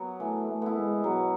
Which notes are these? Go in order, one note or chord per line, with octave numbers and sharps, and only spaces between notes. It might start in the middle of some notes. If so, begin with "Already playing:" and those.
Already playing: F#3 B3 F#4
E3 A3
A3
B3 E4
G#3
B2 F#3